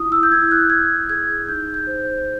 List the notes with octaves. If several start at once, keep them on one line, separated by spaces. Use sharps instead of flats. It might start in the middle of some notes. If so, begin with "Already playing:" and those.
Already playing: E4 D#6
E6
G6
E4 G#6
F#6
E4 G#6
G#4 G#6
D#4 G6
G6
C5